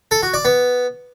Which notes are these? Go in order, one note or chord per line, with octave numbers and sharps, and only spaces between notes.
A4
F#4
D5
B3